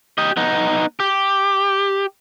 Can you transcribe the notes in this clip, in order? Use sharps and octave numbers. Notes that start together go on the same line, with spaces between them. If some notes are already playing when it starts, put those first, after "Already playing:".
G4 D#5
B3 D#4
G4